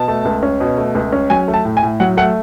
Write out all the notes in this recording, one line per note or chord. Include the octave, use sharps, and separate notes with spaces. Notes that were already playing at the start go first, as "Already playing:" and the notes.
Already playing: B2 A5
A3
C#2
C#4
B2
A3
C#2
C#4
F#3 G#5
A3
A5
A2
G#5
A2
F#3 F#5
A3 F#5